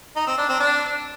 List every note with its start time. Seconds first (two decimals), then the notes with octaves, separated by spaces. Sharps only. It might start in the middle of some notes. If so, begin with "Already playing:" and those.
0.16 D#4
0.27 C4
0.38 D4
0.49 C4
0.60 D4